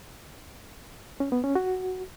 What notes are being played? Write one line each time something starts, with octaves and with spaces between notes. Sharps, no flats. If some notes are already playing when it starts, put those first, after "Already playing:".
C#4
B3
C#4
F#4